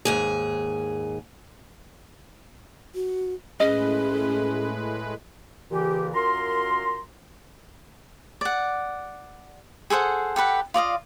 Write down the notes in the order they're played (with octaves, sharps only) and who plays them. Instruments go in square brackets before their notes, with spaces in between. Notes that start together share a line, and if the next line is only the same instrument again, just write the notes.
[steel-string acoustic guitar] D#2 G#2 G#4
[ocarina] F#4
[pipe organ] A2 G#3 B4 [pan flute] C#4 [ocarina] G#4 [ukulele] D#5
[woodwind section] A#2 C#3 E3 G4
F#2 F4 A#4 A#5 C6
[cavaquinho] D5 F#5
G#4 A4 C5 F#5
G4 A4 B4 F#5
F4 D5 D#5 F5